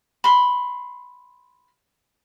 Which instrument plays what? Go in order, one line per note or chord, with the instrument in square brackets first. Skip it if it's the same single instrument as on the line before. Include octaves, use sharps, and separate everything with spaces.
[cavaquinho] B5 C6